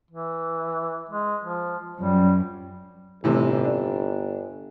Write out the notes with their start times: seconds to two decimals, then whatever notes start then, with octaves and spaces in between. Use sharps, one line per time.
0.11 E3
1.10 G#3
1.44 F3
1.97 F#2 F3 G3
3.24 G1 A2 C3 E3
3.64 D4